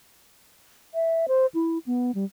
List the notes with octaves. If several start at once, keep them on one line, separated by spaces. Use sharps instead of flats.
E5
C5
E4
B3
G3